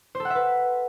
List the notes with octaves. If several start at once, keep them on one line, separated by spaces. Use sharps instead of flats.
C5
A4
F#5
E5
B4